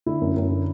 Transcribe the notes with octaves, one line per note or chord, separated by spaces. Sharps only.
D3 E4
F#2
F#2
D3